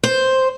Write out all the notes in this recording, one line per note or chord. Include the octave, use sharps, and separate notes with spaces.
C5